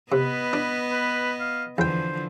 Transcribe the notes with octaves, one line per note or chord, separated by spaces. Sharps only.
C3 B3 B4 D#5
D4
B4
F5
E2 D3 E3 F3 C5 G5